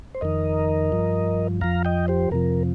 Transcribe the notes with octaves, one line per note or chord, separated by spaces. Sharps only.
C5
F2 D#3 A#4 D#5
G2 F3
F2 F3 F5 A#5
D#5 G5
G4 C5
F2 C3 F3 A#4